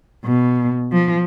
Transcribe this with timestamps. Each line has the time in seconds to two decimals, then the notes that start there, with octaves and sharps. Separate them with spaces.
0.25 B2
0.92 F3